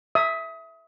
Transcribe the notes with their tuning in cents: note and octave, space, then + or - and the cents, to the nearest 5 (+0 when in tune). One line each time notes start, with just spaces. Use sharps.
E5 +0 D#6 +30